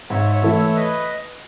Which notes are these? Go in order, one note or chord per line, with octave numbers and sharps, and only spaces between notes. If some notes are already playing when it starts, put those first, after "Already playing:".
G#2 C#5 E5
C#5 E5
E3 A3 E4 A4
C#5 E5
B4 D#5